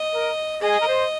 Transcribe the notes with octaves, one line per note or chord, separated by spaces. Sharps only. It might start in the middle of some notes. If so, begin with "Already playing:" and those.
Already playing: D#5
A#4
G#4 D#5
A#4
C5